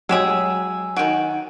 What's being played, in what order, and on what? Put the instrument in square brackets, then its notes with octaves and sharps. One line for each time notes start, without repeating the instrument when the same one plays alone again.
[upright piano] F#3 E7 [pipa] G#3 G4 G#4 [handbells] E6
[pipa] D#3 F#4 [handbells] G#5 D7